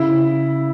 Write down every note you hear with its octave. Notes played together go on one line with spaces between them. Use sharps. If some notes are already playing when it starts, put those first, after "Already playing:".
Already playing: C#3 E4